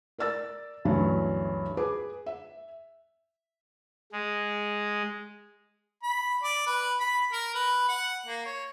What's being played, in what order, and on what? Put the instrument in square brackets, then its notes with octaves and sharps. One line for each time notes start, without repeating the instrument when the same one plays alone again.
[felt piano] A#4 D5 E6 A6
D2 G2 E3 F#3 C#4
G#4 B4 D6
E5
[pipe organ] G#3
[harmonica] B5
D5
B4
B5
A#4
B4
F#5
A#3
C#5